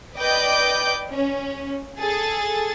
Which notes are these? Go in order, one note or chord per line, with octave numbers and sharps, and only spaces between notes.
B4 D5 D#5 G5 D6 G6
C#4
G#4 A4 A6